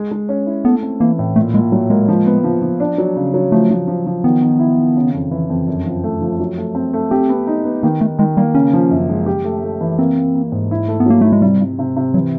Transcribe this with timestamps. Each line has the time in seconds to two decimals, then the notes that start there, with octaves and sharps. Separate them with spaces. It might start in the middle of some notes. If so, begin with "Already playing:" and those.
Already playing: G#3
0.11 G#3
0.29 C#4
0.46 E4
0.64 A3 B3
0.83 C4
1.00 E3 A#3
1.19 A2
1.36 A#2 A3
1.54 A#2 G#3
1.72 F#3 G3
1.90 G#3 A#3
2.08 F3
2.26 B3
2.44 F3
2.62 F3
2.80 D4
2.98 F#3
3.16 C#3
3.34 F#3
3.52 F3 A3
3.70 F3
3.88 F3
4.07 F3
4.24 D#3 B3
4.42 D#3
4.59 E4
4.78 D#3
4.96 C#3
5.14 F2
5.31 E3
5.50 F2
5.67 F#2
5.86 F3
6.04 A3
6.21 F3
6.40 F#3
6.58 A3
6.75 C4
6.93 A3
7.11 C4 G4
7.30 B3
7.47 D#4
7.65 B3
7.83 D#3 A#3
8.01 D#3 A3
8.19 D#3 G#3
8.37 G3 A#3
8.55 C#3 C#4
8.73 F3
8.91 F#2
9.09 G#3
9.26 G4
9.44 A3
9.63 A3
9.81 E3
9.99 A#3 C4
10.17 A#3
10.35 A#3
10.52 G#2
10.71 E4
10.88 A3
11.00 B3
11.06 F#3 A#3
11.21 A3 E4
11.32 G#3
11.42 C3 G3
11.61 C3
11.79 C3
11.96 C3
12.14 E3 F#3